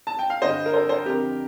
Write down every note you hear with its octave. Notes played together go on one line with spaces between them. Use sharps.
A5
G5
F5
G2 D3 C5 D#5
A#4
A4 C5
A4 C5
F2 D3 G4 A#4